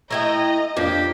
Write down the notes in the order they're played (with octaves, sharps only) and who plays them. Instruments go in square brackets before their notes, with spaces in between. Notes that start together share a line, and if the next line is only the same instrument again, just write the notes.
[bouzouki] A3 E4 G5 [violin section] D#5 [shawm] A#5
[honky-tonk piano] F2 D4 F5 [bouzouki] A#3 [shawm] G4